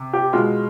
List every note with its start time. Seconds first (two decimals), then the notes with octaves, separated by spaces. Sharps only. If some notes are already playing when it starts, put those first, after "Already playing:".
Already playing: C3
0.13 G4
0.33 B2 G#3 F4